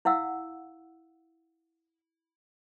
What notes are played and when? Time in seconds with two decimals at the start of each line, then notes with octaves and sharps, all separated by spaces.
0.05 E4 F5 F#5 E6